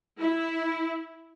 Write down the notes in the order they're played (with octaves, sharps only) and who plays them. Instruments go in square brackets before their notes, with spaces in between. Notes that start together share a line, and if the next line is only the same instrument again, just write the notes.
[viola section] E4